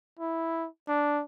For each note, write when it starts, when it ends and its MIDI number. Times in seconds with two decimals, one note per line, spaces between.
0.19 0.68 64
0.88 1.23 62